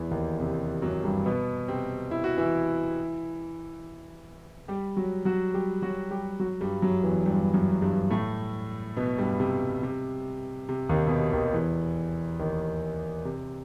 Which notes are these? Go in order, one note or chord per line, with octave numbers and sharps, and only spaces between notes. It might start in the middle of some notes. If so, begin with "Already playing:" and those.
Already playing: E2 E3
D#2 D#3
C3
F#2 F#3
G2 G3
B2 B3
C3 C4
E4
F#4
E3 E4
G3 G4
F#3 F#4
F#3 F#4
G3 G4
F#3 F#4
G3 G4
F#3 F#4
G2 G3
F#2 F#3
E2 E3
G2 G3
F#2 F#3
G2 G3
A2 A3
B2 B3
G2 G3
C3
C3
C3
D#2 D#3
B2
C3
D#2 D#3
E2 E3
D#2 D#3
C3